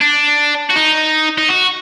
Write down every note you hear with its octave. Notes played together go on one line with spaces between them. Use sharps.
D4
F#4
D#4
D#4
F#4